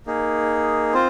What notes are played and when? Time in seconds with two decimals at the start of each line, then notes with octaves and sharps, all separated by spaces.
0.06 A#3 D#4 G#4
0.93 C4 F4 C5